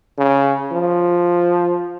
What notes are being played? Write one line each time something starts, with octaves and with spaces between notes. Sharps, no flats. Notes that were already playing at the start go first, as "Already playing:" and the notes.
C#3
F3